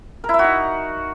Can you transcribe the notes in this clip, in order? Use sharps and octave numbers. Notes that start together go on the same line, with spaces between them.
A#4
E4
E5
F#4
D#4